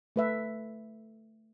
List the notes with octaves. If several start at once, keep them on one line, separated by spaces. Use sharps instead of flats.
A3 B4 E5